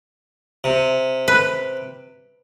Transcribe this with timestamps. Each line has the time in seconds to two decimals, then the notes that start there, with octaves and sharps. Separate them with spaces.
0.64 C3
1.28 B4